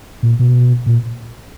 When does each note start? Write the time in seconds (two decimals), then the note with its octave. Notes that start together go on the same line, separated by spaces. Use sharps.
0.23 A#2
0.39 B2
0.86 A#2